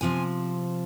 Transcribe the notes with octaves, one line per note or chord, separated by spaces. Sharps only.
C3 F3 C4 G#5